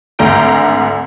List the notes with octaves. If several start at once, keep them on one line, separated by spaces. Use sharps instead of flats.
G#1 D2 D3 A#5 G6 D7